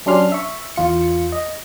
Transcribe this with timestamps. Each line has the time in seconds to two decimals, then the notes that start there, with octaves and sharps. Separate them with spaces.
0.06 F#3 C#4 D4 G4 C6 F6
0.32 E5 C#6
0.76 E2 F4 C#7
1.32 D#5